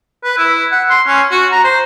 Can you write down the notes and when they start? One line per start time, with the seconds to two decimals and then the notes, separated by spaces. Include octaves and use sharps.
0.24 B4
0.38 E4
0.72 F#5
0.90 C6
1.07 C#4
1.31 F#4
1.52 A#5
1.64 C5